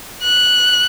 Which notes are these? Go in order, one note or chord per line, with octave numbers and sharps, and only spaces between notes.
F#6